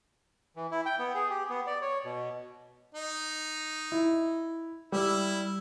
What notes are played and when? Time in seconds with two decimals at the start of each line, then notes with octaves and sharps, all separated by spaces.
0.56 E3
0.71 E4
0.86 G5
0.99 B3
1.15 G#4
1.30 G4
1.50 B3
1.67 D5
1.81 C#5
2.05 B2
2.95 D#4
3.92 E4
4.92 G3 E4 E6